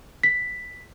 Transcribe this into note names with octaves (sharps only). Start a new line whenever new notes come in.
B6